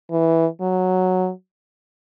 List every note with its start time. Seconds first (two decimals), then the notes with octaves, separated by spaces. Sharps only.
0.11 E3
0.61 F#3